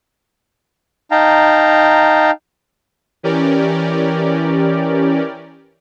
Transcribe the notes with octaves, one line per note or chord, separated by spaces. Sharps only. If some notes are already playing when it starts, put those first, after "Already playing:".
D#4 F5 G5 A5 A#5
E3 C#4 G4 A#4 D5